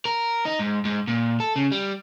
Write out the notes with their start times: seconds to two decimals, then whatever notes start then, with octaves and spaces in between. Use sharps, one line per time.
0.05 A#4
0.45 D#4
0.59 G#2
0.85 G#2
1.08 A#2
1.40 A4
1.56 C#3
1.72 G3